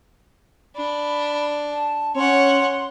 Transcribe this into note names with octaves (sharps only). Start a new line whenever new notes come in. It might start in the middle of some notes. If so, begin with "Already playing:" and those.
D4 B5
A5
C#4 C#5 F#5 C6